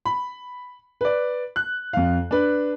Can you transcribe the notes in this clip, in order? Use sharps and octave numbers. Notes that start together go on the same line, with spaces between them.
B5
B4 D5
F#6
F2 F5
D4 B4